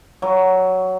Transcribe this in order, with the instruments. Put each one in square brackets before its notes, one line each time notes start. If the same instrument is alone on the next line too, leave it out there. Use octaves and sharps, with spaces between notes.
[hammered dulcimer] F#3